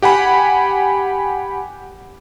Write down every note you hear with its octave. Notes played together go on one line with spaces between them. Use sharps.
G4 F#5 G#5 B5